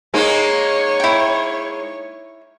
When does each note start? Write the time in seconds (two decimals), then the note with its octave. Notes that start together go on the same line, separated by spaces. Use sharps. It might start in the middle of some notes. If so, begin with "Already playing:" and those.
0.14 G#3 A#3 D#4 C#5
1.00 E4 G5